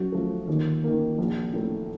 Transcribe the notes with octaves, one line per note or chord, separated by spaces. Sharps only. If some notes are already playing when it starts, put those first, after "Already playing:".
Already playing: F#2 F#4
F3 A3
D#2
D#3 A#3
A#1
A2 A3